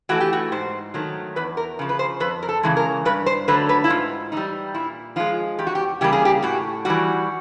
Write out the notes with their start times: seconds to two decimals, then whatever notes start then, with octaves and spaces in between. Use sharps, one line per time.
0.09 E3 A3 F#4
0.20 G4
0.33 F#4
0.52 G#2 C5
0.94 D#3 F#3 A3
1.36 E2 B4
1.57 A#4
1.79 C#3 F3
1.89 B4
1.99 C5
2.20 F2 B4
2.43 A#4
2.49 A4
2.63 C#3 E3 G#3
2.77 A#4
3.05 G2 B4
3.26 C5
3.48 D3 F#3 A3 B4
3.69 B4
3.84 E4
3.90 G#2 F4
4.32 E3 G3 D#4
4.74 A#2 E4
5.16 F3 G#3 F4
5.59 E2 G4
5.67 F#4
5.75 G4
6.01 C#3 E3 G3 A#3 G4
6.13 G#4
6.25 G4
6.42 A2 F#4
6.85 E3 G3 F#4